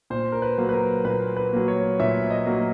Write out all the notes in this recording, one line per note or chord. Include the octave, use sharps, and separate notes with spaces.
A#2 C5
A#4
B4
F#3 A#3
B4
A#4
A#2 B4
B4
F#3 A#3
C#5
A#2 E5
D#5
F#3 A#3